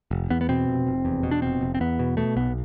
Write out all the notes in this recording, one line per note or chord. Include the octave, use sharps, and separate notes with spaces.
F1
E2 B3
B3
B2 C4
F1
F1
E2
B2
D4
F1 C4
F1
C4
E2 B3
B2
B2 A3
B1 B3